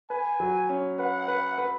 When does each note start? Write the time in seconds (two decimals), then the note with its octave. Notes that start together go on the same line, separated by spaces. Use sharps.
0.10 B4 G#5
0.40 F#3
0.69 C#4
0.99 B4 F#5
1.28 B4
1.58 B4